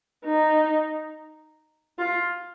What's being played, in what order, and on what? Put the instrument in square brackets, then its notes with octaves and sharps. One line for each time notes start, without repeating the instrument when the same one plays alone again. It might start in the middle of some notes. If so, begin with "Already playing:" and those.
[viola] D#4
F4